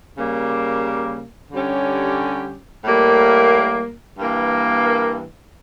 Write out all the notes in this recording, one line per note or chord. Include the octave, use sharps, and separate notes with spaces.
C#3 G3 A#3
D3 G3 C#4 G4
A2 G3 A#3
G2 E3 A#3